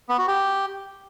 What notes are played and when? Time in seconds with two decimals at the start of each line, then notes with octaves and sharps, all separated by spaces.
0.09 B3
0.18 F#4
0.28 G4